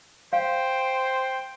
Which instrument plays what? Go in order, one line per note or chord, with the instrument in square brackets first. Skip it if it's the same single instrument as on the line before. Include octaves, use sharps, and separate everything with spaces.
[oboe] C5 [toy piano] F5 [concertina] G5